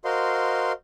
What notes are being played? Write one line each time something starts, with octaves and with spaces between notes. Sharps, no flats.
F#4 A#4 C5 D#5 F5 C6